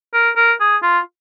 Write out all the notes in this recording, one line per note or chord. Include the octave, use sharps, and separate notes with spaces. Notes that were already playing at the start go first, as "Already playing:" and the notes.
A#4
A#4
G#4
F4